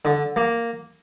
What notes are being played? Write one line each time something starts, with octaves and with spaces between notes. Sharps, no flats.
D3
A#3